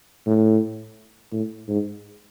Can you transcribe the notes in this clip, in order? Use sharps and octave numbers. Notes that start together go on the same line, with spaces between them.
A2
A2
G#2